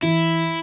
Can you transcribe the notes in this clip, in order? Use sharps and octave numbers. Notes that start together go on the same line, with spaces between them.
E3 E4